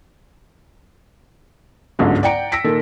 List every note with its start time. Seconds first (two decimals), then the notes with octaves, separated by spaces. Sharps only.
1.99 G1 C#2 G#2 D3 F#3
2.23 D5 F#5 G5 A#5 C#7 D7
2.52 E6 A#6 B6 D7
2.64 A#2 D#3 A4